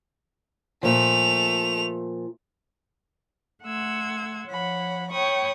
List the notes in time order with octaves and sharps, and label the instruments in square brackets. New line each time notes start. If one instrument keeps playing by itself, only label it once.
[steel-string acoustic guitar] A#2 F3 [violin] A3 F7
[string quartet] A3 F#5 C6 E6 G#6
F3 C#5 F#5 B5
C#5 G5 B5 C#6 D#6